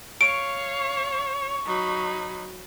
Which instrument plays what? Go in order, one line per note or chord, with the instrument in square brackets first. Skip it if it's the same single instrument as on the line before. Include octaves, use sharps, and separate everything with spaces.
[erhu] C#5 [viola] F5 [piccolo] C#6 [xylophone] D7
[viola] F#3 B5 [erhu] D#4